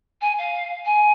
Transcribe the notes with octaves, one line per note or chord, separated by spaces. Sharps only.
G#5
F5
G#5